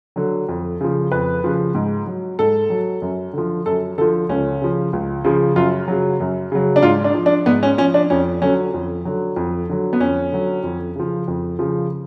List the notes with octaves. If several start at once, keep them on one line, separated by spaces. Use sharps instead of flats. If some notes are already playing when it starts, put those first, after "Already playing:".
D3 F#3
F2
C#3 F3
F2 B4
C#3 F3
G#2
F#3
G#2 A4
F#3
F#2
D3 F3
F#2 A4
D3 F3 A4
C#2 C#4
C#3 F3
C#2
C#3 F3
F#2 F4
C#3 F#3
F#2
C#3 F#3
D4
G#2 F4
D4
F3
D4
G#2 B3
C#4
F3 C#4
D4
F2 C#4
D3 F#3 C#4
F2
D3 F#3
F2
D3 F#3
B3
F2 C#4
D3 F#3
F2
C#3 F3
F2
C#3 F3